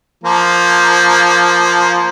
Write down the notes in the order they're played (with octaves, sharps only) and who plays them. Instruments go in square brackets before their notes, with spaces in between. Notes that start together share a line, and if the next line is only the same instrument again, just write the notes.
[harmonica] F3 A#3